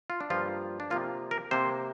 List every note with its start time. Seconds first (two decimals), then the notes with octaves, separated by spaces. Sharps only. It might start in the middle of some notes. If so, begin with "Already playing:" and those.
0.10 F4
0.20 D4
0.30 G2 F3 A#3 F4
0.80 D4
0.90 C3 F3 A#3 F4
1.31 A#4
1.51 C3 A#3 C5